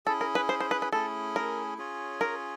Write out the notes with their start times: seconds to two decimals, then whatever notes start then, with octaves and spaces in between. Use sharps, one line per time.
0.06 C#4 E4 G#4 A4
0.21 A#4
0.35 B4
0.49 C5
0.60 C5
0.71 B4
0.82 B4
0.93 A3 C#4 E4 G#4 A4
1.36 A#4
1.78 C#4 F4 G#4 C#5
2.21 A#4